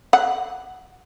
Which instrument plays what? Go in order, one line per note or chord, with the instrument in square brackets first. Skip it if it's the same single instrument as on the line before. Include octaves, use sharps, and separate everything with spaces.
[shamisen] F#5